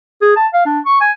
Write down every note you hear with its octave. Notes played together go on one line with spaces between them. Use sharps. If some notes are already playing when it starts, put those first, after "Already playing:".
G#4
A5
F5
D4
C#6
G#5